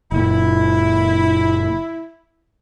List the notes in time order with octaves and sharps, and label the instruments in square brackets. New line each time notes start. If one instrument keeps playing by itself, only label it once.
[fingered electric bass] F#1 A#2 [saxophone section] E4